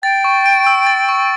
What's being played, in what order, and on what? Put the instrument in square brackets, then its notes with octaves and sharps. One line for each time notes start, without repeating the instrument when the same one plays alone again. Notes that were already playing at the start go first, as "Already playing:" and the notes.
[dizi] G5 [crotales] A6
[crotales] C#6
D7
E6
A6
C#6